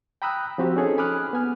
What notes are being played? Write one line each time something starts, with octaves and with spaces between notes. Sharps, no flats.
G5 A#5 B5 D#6 E6 F#6
F3 C4 F#4 G4
C#4 D#4 G#4 A4
G#5 B5 D6 D#6 F6 F#6
B3 G#5 F6